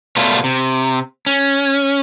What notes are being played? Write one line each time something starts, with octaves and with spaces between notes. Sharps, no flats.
B2 F#3 G3 A3 F4
C3
C#4